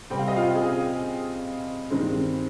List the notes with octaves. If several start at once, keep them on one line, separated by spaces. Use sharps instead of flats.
C3 G3 C4 G5
F5
D#5
F4 F5
G#4 G#5
G2 D#3 G#3 C4